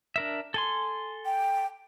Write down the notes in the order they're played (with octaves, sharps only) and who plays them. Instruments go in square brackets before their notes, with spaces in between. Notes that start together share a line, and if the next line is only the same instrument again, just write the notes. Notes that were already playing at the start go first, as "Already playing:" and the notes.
[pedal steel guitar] D4 A#4 E5
A4 G#5 C6
[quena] G5